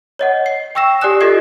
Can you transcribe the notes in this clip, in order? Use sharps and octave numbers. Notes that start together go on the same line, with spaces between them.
C#5 D#5 F#5
C7
G5 C#6 E6 A#6 E7
G4 D5 G#5 D#6 F#6 E7
F4 G4 A4 D#5 G#6 C7